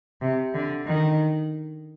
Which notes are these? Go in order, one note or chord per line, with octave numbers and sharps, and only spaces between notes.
C3
D3
D#3